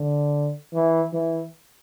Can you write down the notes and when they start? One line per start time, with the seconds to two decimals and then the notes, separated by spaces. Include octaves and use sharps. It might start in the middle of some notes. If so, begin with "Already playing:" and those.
Already playing: D3
0.74 E3
1.13 E3